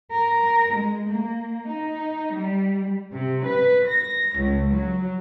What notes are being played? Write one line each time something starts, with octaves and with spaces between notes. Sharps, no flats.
A#4
G#3
A#3
D#4
G3
C3
B4
A#6
C#2
F#3